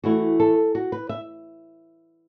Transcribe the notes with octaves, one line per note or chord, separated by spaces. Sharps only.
E3 A3 E4 F#4
A4
F#4
B4
E5